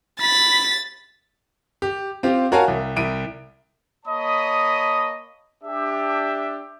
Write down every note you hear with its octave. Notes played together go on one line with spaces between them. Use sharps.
B5 A6 B6
G4
C4 F4 G4
F#4 A#4 C#5 F5 G#5 A5
C2
C2 D7 D#7
A#3 C#5 D#5 A5 B5 D#6
D4 G4 E5